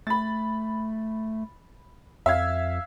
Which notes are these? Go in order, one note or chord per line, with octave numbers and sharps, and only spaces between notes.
A3 B5 A6
F2 E5 F5 G#6